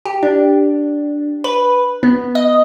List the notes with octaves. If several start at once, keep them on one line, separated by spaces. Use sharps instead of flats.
G4
D4
B4
B3
D#5